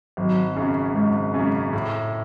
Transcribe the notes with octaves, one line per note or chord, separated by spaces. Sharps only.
G#1 F#3
F#2 C#3
G#1 G#3
F#2 C#3
A2